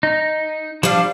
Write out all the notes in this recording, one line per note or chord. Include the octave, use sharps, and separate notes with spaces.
D#4
F3 G3 D4 F5